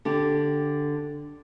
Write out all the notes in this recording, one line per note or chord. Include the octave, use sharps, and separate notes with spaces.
D3 G4